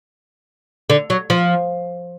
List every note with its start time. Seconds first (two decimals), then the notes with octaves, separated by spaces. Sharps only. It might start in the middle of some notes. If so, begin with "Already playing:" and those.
0.90 D3
1.10 F#3
1.30 F3